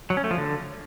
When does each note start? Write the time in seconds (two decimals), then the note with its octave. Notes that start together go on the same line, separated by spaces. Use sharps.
0.10 F#3
0.17 C#4
0.24 A3
0.31 F3
0.38 D3